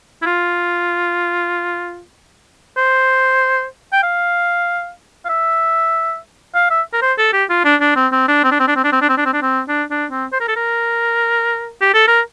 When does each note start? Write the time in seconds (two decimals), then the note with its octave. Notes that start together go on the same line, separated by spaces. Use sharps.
0.22 E4
0.26 F4
2.77 C5
3.93 G5
4.03 F5
5.25 F5
5.29 E5
6.55 F5
6.70 E5
6.93 A#4
7.02 C5
7.18 A4
7.33 G4
7.50 F4
7.65 D4
7.81 D4
7.96 C4
8.12 C4
8.28 D4
8.44 C4
8.51 D4
8.60 C4
8.68 D4
8.76 C4
8.84 D4
8.93 C4
9.02 D4
9.09 C4
9.17 D4
9.25 C4
9.33 D4
9.42 C4
9.69 D4
9.91 D4
10.11 C4
10.32 C5
10.40 A#4
10.48 A4
10.56 A#4
11.81 G4
11.94 A4
12.08 A#4